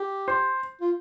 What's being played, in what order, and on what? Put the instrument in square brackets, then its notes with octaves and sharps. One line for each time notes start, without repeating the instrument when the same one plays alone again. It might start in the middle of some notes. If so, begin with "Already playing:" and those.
Already playing: [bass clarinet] G4
[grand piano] C5
[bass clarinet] F4